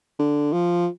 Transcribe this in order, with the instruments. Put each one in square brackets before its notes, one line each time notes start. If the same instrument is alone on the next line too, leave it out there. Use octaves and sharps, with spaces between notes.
[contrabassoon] D3
F3